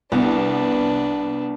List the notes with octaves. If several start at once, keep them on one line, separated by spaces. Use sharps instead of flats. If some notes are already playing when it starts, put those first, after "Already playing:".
C2 B3 D4 B4